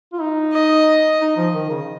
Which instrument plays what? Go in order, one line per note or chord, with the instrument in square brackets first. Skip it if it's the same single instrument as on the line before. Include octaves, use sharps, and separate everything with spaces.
[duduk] F4
D#4
[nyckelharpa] D#5
[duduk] D#4
F3
D#3
C#3